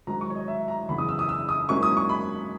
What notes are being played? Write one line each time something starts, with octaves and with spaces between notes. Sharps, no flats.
G#2 D#3 F#3 A#5
C#6
C#5
D#5
E5
A#5
F#1 E2 C#3 E3 B3 B5
D#6
E6
D#6
E6
D#6
G#2 F#3 A#3 C#4 E4 C#6
D#6
C#6
B5